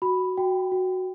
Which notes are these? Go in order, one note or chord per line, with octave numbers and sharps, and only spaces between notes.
F#4 B5
F#4 G5
F#4